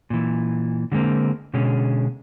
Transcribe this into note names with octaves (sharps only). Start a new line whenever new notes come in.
A#2 E3
D3 F#3 G#3 A#3 C4
B2 D3 G#3 C#4